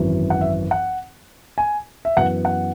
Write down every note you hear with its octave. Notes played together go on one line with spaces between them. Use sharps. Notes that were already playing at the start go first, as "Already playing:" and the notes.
Already playing: G#1 F#2 E3
F#5
E5
F#5
G#5
E5
F#2 E3 B3 F#5
F#5